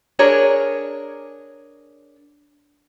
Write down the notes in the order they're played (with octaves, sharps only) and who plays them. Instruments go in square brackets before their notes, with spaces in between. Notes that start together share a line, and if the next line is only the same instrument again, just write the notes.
[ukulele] D4 G#4 A#4 C#5